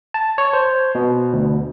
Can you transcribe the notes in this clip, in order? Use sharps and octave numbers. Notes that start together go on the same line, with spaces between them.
A5
C#5
C5
B2
D2